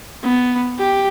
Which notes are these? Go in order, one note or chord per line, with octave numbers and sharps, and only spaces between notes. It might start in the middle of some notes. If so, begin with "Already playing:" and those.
B3
G4